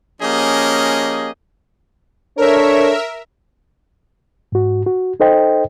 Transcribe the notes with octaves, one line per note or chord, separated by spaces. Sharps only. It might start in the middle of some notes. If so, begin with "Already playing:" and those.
F3 A#3 C#4 G4 G#4 D#5
D4 A4 A#4 C#5 E5
G#2 F#4
F#4
D#4 A4 C5 D#5 G5